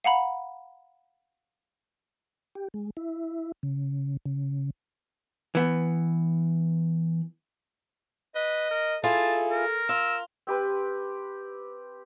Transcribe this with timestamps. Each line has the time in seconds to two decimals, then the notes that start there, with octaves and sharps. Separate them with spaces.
0.04 F5 F#5 A#5 B5
2.55 G4
2.74 G#3
2.97 E4
3.63 C#3
4.26 C#3
5.55 E3 B3
8.35 B4 D#5
8.71 A#4
9.03 E4 F4 G#4 A4 A5
9.51 A#4
9.89 F4 E6
10.47 C4 G4 B4